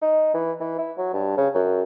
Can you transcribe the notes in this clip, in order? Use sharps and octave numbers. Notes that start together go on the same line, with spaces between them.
D#4
E3
E3
E4
F#3
G2
C#3
F#2